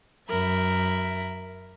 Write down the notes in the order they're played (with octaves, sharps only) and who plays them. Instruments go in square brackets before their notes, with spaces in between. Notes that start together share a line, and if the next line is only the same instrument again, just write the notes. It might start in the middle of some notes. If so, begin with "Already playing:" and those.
[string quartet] F#2 A#4 E5 B5